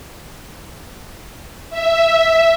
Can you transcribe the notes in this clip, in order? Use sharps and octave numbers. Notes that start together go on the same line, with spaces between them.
E5